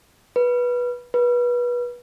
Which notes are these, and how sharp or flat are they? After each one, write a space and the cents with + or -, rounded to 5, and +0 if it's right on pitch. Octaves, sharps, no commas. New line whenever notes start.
B4 -15
B4 -25